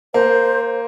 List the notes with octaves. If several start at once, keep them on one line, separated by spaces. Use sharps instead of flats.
A#3 C5